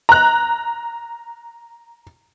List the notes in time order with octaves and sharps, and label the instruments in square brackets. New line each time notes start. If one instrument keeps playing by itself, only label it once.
[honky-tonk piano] A#5 F#6